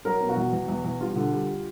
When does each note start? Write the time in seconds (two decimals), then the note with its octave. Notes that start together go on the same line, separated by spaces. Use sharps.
0.05 F#3 A#4
0.21 B2
0.29 F#4
0.37 E2
0.52 E2
0.68 E2
0.85 E2
1.00 G3 F4
1.16 D3
1.32 G3